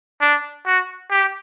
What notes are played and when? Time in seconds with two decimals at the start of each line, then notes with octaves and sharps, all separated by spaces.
0.21 D4
0.66 F#4
1.11 G4